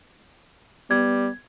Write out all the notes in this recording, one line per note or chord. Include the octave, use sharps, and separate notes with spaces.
G3 B3 G#6